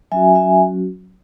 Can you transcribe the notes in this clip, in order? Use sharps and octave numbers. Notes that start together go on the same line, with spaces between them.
F#3 C#4 F#4 E5 G#5
E5 G#5